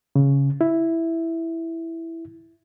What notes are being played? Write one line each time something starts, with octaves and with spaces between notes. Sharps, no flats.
C#3
E4